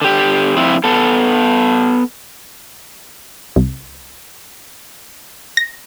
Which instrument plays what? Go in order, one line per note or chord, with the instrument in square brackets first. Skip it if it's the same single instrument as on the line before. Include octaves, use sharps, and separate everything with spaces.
[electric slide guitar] D3 G4
F3 C4 E4
B3 A4
[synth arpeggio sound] C2
A#6